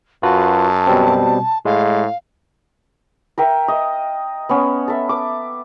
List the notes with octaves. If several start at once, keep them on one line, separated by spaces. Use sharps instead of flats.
F#2 F4 F#4 B4 A5
B2 G3 C4
A2 G#3 F5
A#4 E5 G5
D#5
B3 C#4
A4 E5
D6